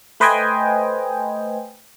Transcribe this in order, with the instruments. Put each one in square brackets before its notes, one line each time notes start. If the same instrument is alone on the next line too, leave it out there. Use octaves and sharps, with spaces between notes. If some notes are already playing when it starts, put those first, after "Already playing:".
[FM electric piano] A3 B4 C5 D#5 G5 G#5